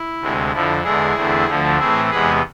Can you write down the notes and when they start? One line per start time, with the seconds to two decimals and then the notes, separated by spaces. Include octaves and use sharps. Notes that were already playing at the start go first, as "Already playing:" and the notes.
Already playing: E4
0.20 D2 C3 G#3
0.52 F2 D3 F3 E4
0.83 E2 D3 G#3 E4 G#4
1.16 E2 D3 A3 C4
1.47 D2 D3 F3 A3
1.78 A2 E3 A3 C4 E4 G#4
2.10 E2 C3 G#3 B3 G#4 B4